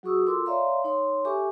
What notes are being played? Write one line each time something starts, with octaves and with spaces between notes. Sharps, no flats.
F#3 F#4 G#4 C#6 D#6 E6
F4 A4 A#4 C6 D6 E6
C#5 D5 E5 F5 A#5 C6
D#4 C#5 C6
G4 A4 E5 G#5 C#6 D6